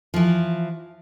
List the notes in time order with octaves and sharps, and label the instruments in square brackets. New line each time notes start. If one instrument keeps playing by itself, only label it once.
[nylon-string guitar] E3 F3